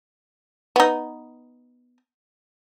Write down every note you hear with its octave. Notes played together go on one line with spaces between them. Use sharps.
B3 D#4